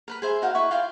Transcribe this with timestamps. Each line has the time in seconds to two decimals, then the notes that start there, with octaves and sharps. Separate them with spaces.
0.08 A#4 B4 B5
0.22 G#4 C5 E5
0.42 D#4 F#4 A#4 F5
0.55 E4 B4 E5 C#6
0.71 F4 F5 G5 C6